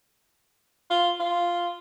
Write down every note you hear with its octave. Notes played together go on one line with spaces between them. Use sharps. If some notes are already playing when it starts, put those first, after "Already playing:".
F4
F4